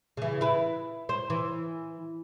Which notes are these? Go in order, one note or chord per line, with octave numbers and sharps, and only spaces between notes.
C#3 E3
E4 B4
C5
E3